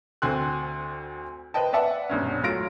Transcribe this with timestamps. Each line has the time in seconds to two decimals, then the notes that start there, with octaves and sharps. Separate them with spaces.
0.22 D2 C4 G#5 C6 F#6
1.54 B4 C5 D#5 G5 A5
1.73 B4 D5 E5 F#5 A5
2.10 D#1 B1 G2 C#4
2.43 A2 F#3 F4 F6 A#6 D7